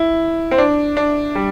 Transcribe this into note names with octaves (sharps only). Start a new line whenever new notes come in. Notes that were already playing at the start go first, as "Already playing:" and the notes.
Already playing: E4
C4
D4
D4
G3